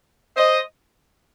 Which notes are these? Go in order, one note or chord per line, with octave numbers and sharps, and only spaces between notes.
C5 D#5